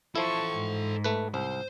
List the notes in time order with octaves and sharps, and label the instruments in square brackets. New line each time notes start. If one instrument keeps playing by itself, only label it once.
[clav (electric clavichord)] F3 E4 [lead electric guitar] A4 C6 [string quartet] A5 C#6
[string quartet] G#2
[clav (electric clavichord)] A3 B4
[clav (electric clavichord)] C2 [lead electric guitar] C5